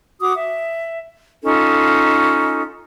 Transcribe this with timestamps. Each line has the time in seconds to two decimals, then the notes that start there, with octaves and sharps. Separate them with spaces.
0.20 F#4 D6 D#6
0.35 E5
1.42 C#4 D#4 F4 A4